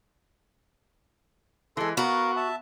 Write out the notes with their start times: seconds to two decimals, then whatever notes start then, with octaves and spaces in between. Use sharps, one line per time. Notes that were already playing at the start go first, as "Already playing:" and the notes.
1.77 E3 G#3 A4 C6
1.97 B3 F#4 A#4 F5
2.37 E5 A5